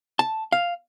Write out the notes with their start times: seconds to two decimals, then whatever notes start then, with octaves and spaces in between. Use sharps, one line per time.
0.19 A5
0.52 F5